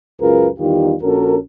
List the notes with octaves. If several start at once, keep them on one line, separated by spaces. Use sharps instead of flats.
C#2 F#2 F4 G#4 A#4 B4
E2 D#3 G3 D#4 F4 G4
A#1 C#4 F#4 A4 A#4